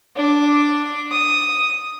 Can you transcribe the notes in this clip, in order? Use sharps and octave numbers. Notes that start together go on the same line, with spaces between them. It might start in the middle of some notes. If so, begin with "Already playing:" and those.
D4 D6
D#6